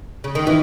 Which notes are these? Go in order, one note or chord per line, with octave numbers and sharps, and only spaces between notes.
C#3
D#3
D#3 E3